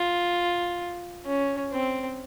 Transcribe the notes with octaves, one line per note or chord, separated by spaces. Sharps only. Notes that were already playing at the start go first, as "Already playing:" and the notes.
Already playing: F4
C#4
C4